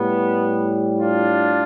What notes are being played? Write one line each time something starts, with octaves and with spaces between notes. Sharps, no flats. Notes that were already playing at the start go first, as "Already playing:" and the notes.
Already playing: A2 G3 B3
D4 F4